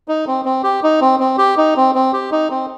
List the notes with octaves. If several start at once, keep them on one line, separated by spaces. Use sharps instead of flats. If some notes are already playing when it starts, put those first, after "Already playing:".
D#4
C4
C4
G4
D#4
C4
C4
G4
D#4
C4
C4
G4
D#4
C4